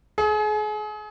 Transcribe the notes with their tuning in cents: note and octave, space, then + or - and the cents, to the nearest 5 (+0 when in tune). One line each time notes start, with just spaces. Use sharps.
G#4 +35